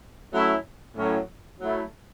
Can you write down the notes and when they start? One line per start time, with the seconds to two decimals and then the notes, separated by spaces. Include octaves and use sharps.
0.33 F#3 A3 C#4 E4
0.97 A2 F#3 C#4
1.60 F#3 A3 E4